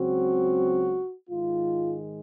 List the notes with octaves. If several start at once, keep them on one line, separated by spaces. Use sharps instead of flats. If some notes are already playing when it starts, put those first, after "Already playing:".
Already playing: C#2 C#3 F#3 C4 F#4
G#2 D#3 G#3 F4